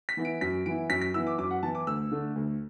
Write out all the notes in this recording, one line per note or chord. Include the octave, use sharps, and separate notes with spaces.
B6
E3 B3 E4
D7
F#2 B6
E3 B3 E4 D7
F#2 B6
B6
E3 B3 E4 E6
D6
F#2 D6
F#5
E3 B3 E4 A5
D6
D2 E6
D3 A3 D4
D2